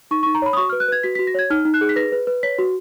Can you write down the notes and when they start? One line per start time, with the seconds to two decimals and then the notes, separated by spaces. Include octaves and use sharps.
0.11 D#4 C#6
0.23 C#6
0.26 D#4
0.35 A#5
0.42 C#5 B5
0.53 D#6
0.57 F#4 C#6
0.69 B4 F6
0.80 F#6
0.88 B4 G#6
1.03 F#4 B6
1.15 B6
1.19 F#4
1.27 A#6
1.34 C#5 G#6
1.50 D#4 F6
1.65 D#4
1.74 F#6
1.81 G#4
1.89 B6
1.96 B4 A#6
2.12 B4
2.27 B4
2.43 C#5 B6
2.58 F#4